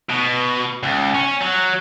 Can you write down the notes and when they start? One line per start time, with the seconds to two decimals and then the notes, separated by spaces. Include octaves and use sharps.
0.09 B2
0.83 C#2
1.15 C#4
1.42 F#3